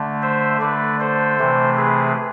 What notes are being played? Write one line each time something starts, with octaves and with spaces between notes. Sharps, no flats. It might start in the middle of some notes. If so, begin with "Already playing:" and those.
Already playing: D3 A3
C5 E5
D3 A3 B4 D5
A4 C5
C3 E3 A3
G#4 B4